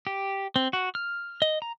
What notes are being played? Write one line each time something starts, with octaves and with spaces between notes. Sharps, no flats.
G4
C4
F#4
F6
D#5
A#5